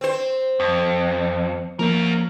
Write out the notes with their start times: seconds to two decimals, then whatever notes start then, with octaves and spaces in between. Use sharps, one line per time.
0.01 C4 C5
0.60 F2
1.79 F3 A#3 C#4 A#4